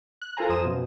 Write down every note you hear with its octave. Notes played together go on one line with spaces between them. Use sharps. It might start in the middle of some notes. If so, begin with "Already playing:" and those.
F#6
F4 A4 A#4 C5 G#5 A#5
F2 C5 D#6 E7
F#2 B2